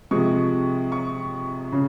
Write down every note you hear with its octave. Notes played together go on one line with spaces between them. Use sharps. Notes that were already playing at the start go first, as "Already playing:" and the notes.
C3 F3 G#3 C#6
C#6
C#3